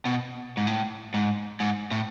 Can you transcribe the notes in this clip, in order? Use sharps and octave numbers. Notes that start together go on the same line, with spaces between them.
B2
G#2
A2
G#2
G#2
A2